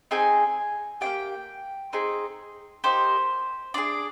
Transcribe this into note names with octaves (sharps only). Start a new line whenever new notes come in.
C4 D#4 G#4 G#5
A#3 D4 G4 G5
C4 D#4 G#4
A#3 D#4 G4 C5
D4 F4 G#4 D5